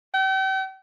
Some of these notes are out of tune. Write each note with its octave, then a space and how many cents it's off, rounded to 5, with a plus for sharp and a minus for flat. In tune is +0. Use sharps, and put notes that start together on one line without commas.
G5 -40